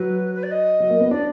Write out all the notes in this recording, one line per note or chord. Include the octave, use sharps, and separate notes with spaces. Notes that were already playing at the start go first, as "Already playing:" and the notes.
Already playing: F#3 B4
B4
D5
D#5
F#3
A#3
B3
D4 D5